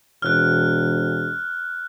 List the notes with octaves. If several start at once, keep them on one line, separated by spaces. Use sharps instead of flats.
E1 F6 F#6